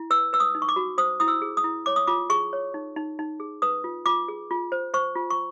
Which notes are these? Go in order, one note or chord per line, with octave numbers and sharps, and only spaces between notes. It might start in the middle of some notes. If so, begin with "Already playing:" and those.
Already playing: E4
B4 E6
B4 E6
D#6
D#4
C#6
D6
F#4
C5 D#6
E4 D#6
E6
G#4
D#6
E4
C#5 D6
D#6
F4 D6
G#4 C#6
C#5
D#4
D#4
D#4
G#4
B4 D#6
F4
F4 D6
G#4
F4
C5
C5 C#6
F4
C#6